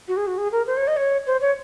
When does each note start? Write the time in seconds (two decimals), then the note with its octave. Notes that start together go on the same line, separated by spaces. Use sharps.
0.08 F#4
0.17 G#4
0.27 F#4
0.38 G#4
0.52 A#4
0.67 C5
0.77 C#5
0.87 D#5
0.97 C#5
1.27 C5
1.41 C#5